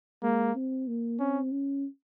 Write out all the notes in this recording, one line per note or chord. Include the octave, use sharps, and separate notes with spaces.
G#3 A#3
C4
A#3
C4 C#4
C#4